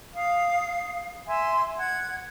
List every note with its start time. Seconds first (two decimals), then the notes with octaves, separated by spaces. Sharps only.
0.15 F5 D#6
1.27 E5 G#5 C6
1.77 F#5 G#6